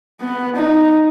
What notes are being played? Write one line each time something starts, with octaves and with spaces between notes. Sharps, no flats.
B3
D#4